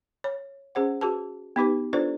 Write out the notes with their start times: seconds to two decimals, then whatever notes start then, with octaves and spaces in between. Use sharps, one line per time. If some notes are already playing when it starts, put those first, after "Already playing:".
0.24 C#5
0.75 C#4 G#4 C5 F#5
1.01 F#4 G#4 B4 A5
1.56 B3 D#4 G4 B4
1.93 D4 F4 A4 B4 C5 D5